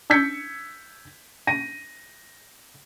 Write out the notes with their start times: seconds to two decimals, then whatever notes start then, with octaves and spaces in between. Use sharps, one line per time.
0.10 E6 G6 G#6 B6 C#7
1.47 A#6 D#7